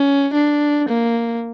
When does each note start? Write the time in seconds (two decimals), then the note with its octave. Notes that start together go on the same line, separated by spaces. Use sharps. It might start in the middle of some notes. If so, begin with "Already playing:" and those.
Already playing: C#4
0.33 D4
0.88 A#3